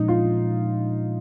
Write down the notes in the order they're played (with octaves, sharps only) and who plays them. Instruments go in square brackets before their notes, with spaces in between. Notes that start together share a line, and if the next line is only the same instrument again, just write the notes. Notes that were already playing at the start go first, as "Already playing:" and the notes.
Already playing: [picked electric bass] A#2 F3 G#3 C#4 [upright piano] D#4
[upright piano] F4